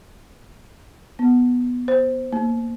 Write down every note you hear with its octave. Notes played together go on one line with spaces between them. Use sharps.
B3
C5
A#3